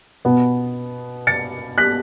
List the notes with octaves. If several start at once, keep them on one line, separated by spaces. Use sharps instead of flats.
B2 B3
A6 C#7
F#6 B6